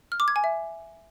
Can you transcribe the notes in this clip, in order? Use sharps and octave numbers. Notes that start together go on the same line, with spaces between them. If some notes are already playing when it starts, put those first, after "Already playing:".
F6
D6
G#6
G#5
E5